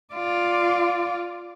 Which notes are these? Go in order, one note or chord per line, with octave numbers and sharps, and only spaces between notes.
F4 D5